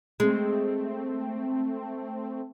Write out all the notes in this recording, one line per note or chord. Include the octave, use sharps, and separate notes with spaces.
G#3 A3 C4